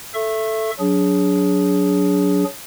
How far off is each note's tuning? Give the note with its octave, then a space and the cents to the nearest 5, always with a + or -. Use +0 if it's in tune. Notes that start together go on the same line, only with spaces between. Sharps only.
A4 +0 E5 +15 C#6 -25
F#3 +0 D4 -30 G#4 +0